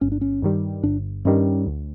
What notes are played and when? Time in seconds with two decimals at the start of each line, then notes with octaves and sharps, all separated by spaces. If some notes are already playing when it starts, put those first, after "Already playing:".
0.01 G1 C#4
0.12 D4
0.21 C#4
0.42 G2 D#3 G3
0.84 G1 D4
1.25 G2 D#3 G3 C#4
1.66 D2